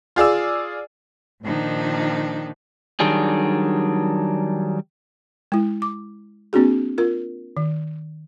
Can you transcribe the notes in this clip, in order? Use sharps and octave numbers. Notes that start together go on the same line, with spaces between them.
F4 G#4 D5 E6
A#2 D#3 F3 D4 D#4
D#3 F#3 G3 D4 G#4
G#3 E4
D6
A#3 C4 D4 F#4 G#4
F4 A#4
D#3